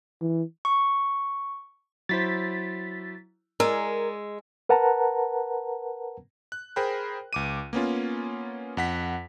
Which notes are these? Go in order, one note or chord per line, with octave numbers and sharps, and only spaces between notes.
E3
C#6
F#3 E4 C5 A6 B6
G#3 A#4 D5 G#5 E6
A#4 B4 F#5 A5 A#5
F#6
G#4 A#4 C5 G5 B5 F#6
C#2 D6 D#7
A#3 B3 C#4 F4
F2 F#5 B6